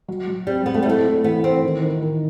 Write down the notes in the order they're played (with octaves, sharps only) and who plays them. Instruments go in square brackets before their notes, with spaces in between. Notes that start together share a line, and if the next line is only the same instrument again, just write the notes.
[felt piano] F#3
F#3
[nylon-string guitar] G3 [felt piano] C4
[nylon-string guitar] B3 [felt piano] C4
[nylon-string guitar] A3
G3
[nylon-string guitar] A3 [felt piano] E4
[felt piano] E4
[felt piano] E3 [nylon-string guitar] B3
[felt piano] E3 [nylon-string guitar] C4
[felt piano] D#3
D#3
D#3